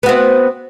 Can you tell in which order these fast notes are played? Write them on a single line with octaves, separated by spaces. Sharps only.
B3 F#4 C4